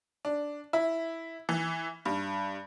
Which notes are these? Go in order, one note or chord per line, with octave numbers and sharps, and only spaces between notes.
D4
E4
E3
G2